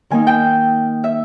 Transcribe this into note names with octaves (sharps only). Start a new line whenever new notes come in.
D#3 A#3 D#4 G#5
G5
E5